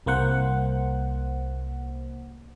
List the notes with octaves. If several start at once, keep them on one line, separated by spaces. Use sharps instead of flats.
C2 A#3 C5 F#5